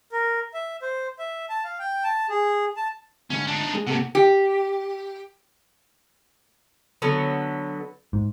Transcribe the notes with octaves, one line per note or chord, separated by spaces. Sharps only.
A#4
E5
C5
E5
A5
F5
G5
A5
G#4
A5
D2 G#2 D3 C#4
D4 D#4
G#3 G#4
G#2 C3 A#3 A4 F#5
G4
D3 F#3 B3
G#2